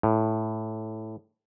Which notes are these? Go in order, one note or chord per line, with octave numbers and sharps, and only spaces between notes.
A2